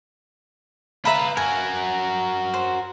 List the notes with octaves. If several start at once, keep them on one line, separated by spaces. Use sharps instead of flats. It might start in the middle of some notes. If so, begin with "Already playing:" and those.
F4 B4 E5 A#5 B5
F#4 A#4 G#5
C5